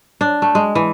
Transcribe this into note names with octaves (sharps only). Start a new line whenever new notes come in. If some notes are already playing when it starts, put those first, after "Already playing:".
D4
A3
G#3
E3